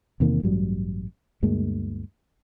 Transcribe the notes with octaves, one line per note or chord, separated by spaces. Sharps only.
E2 C3 D#3 A#3
A1 G2 F#3 G3
D2 G2 G#3 A#3